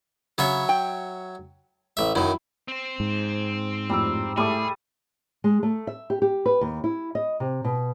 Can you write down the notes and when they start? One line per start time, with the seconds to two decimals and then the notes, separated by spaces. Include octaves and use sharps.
0.38 C#3 F#3 C#5 E5
0.69 G5
1.97 A1 E5
2.15 F#2 D#3 E4
2.68 C4 C5
3.00 G#2
3.90 F2 A2 G3 A#5 E6
4.37 A2 G3 A3 G#4 E5 D6
5.44 G#3
5.63 A3
5.87 E5
6.10 G4
6.22 G4
6.46 B4
6.61 D#2
6.84 E4
7.15 D#5
7.40 C3
7.64 B2